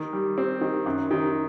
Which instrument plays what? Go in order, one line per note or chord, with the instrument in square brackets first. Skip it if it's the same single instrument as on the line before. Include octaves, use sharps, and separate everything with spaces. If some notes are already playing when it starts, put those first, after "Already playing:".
Already playing: [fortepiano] D#3
G3
C4
D#3
F#2
D#3